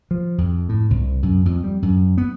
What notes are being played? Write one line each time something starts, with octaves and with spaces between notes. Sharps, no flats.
F3
F2
A2
C2
F#2
F2
G3
F#2
B3